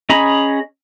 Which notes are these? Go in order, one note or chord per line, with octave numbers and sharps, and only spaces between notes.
C#4 G#4 D#5 A#5 B5